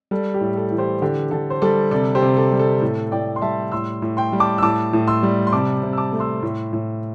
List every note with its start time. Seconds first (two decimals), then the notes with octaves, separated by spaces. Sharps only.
0.11 G3 A4
0.34 G4
0.41 A2
0.57 A4
0.71 E3
0.78 G4 C5
1.02 D3 G4
1.31 D3 A4
1.50 C5
1.62 G3 A4 D5
1.91 C3 A4 D5
2.15 G4 C5
2.22 C3
2.37 A4
2.52 G3
2.59 A4
2.82 A2 A4
3.12 A2 D5 G5
3.36 C6
3.42 G3 E5 A5
3.72 A2 C6 E6
4.02 A2
4.17 G5 C6
4.33 G3
4.40 A5 D6
4.58 E6
4.62 A2 A5 D6
4.93 A2
5.07 C6 E6
5.23 G3
5.47 C6
5.53 C3 A5 D6
5.83 C3
5.93 E6
5.97 A5 D6
6.13 A3
6.20 C6 E6
6.43 A2
6.73 A2